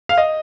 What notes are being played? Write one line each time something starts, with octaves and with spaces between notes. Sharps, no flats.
F5
D#5